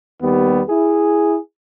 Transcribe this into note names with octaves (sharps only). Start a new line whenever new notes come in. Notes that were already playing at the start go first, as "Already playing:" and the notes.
D#2 G3 B3
E4 G#4